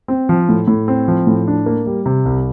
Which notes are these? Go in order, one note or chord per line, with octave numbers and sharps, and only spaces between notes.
C4
F3
A2
A2
C4
F3
A2
D4
A#3
G3
C3
C2